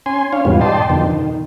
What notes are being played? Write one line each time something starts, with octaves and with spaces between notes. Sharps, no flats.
C#4 G#5 C6
C#4 D4 C#5 F5
E2 G#2 B2 G3 B3 F4
D5 D#5 G5 A5 C6
F2 B2 D3 D#3
D#3